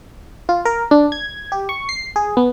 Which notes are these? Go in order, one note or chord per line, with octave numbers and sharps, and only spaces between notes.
F4
A#4
D4
G#6
G4
C#6
C7
G#4
B3